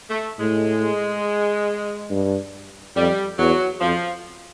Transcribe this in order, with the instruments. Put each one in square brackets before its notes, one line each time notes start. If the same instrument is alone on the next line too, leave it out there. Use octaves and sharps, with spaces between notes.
[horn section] A3
[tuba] A2 [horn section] G#3
[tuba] G2
[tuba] F2 [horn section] G3
[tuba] E2 [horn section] F#3
[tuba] F2 [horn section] F3